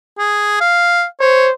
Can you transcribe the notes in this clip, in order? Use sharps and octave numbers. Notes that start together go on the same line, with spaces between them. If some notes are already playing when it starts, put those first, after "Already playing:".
G#4
F5
C5 C#5